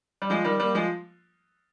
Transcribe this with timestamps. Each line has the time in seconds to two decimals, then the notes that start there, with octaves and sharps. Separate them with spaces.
0.22 G3
0.30 F3 G#3
0.45 D#3 G3
0.60 G3 A#3
0.75 F3 G#3